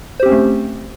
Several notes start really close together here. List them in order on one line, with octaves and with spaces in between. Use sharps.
C5 G4 C4 C#4 A3